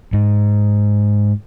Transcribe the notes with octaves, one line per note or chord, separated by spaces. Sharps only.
G#2